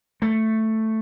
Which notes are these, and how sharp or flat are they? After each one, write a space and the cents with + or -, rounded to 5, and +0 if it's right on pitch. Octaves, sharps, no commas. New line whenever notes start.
A3 +5